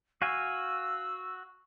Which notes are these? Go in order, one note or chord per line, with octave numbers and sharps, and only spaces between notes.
F#4 F5 G#5 E6